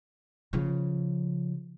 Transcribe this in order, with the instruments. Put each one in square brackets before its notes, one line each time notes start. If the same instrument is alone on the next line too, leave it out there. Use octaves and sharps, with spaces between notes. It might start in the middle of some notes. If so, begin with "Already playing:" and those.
[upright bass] C#3 F3